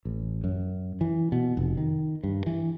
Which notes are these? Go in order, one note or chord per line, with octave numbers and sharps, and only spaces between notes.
A1
F#2
E3
B2
F1
D#3
G2
E3